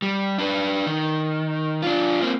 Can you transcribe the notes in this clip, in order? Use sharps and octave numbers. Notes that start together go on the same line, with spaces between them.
G3
D4 B4
D#3
D4 F4
A#3 C4